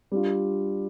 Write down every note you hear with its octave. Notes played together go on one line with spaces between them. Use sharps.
G3 D4 F4